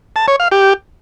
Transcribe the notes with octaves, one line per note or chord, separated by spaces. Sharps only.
A5
C#5
F5
G4